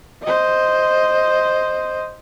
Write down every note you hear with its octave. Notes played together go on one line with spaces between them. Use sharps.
C5 D#5